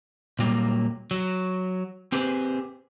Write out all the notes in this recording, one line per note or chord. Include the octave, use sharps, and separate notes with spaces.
A#2 F#3 G3 A#3
F#3
C4 G4 G#4 B4 C5